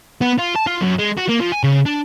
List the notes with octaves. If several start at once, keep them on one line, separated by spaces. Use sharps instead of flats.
B3
F4
A5
F4
F#2
G#3
F#4
A#3
F3
G#5
C#3
D4